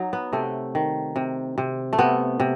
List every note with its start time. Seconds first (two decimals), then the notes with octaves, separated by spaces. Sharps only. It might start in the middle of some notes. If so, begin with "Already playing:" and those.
Already playing: F#3 D#4
0.13 B3
0.33 C3 A3
0.75 D#3
1.16 C3
1.58 C3
1.93 A3
1.98 C3 B3
2.40 C3